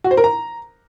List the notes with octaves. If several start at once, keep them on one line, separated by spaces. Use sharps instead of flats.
F#4
C5
A#4
A#5